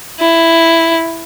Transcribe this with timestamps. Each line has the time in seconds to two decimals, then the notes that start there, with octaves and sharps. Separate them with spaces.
0.20 E4